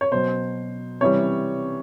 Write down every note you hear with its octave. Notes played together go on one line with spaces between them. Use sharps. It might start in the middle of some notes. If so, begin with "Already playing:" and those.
C#5
B2 F#3 C5
C3 E3 G3 C#5